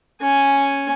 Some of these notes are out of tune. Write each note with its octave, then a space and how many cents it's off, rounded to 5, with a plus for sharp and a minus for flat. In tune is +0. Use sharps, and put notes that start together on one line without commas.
C#4 +0 G#5 +0